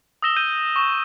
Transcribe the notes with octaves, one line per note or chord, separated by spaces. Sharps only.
D#6 E6 A#6 E7 G7
G6 D#7 G7
C#6 E7